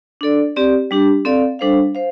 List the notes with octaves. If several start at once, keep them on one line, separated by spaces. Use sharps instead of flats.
D4 A4 D5
C4 G4 D5
G3 D4 G4
C4 A4 D5 F5
G3 D4 A4 C5 F5
C5 F5